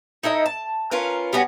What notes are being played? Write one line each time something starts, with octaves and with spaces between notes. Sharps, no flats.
D#4 E4 A4 D#5
A5
C#4 F4 A#4 B4
G3 B3 C#4 F#4